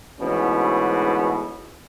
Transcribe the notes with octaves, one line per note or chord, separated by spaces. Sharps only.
D2 G#2 B2 E3 C#4